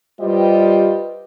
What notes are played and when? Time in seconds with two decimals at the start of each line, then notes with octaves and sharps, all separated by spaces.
0.20 G3 F4 G4 B4 C5 D#5